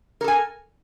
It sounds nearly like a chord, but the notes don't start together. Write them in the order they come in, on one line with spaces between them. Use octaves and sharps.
A#4 A4 G#5